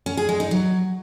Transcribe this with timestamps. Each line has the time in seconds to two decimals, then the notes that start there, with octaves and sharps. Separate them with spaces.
0.06 C#4
0.17 G#4
0.29 G#3
0.40 D#4
0.51 F#3